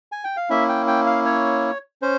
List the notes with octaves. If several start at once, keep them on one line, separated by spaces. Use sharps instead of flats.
G#5
G5
F5
A#3 C#4 E4 E5
G5
G5
F5
C#5
C#4 C5